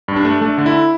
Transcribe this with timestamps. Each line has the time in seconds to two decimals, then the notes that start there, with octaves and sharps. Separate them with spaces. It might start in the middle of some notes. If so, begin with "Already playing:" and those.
0.08 G2
0.16 D4
0.25 A3
0.42 A3 D4
0.58 D3
0.66 E4